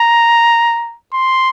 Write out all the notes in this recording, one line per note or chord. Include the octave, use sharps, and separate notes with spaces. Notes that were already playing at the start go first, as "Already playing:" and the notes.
Already playing: A#5
C6